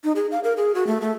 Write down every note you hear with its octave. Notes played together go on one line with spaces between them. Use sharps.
D#4
G#4
F5
A#4
G#4
F#4
A3
A3